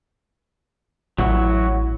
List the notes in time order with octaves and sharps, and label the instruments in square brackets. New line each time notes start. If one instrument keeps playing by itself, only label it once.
[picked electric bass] A1 [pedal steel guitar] F#3 E4 F#4